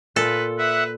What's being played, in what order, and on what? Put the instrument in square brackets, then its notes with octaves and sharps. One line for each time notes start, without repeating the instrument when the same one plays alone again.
[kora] A#2 F4 [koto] A4 [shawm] B4
[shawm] B4 [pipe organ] E5 F#5